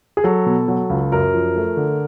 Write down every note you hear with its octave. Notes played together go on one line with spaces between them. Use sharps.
G#4
F#3 A4
B2
F#3
C#2
F#2 A#4
F3
A3
D3